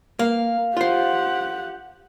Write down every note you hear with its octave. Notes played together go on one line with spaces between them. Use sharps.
A#3 F5
F4 G4 C5 F#5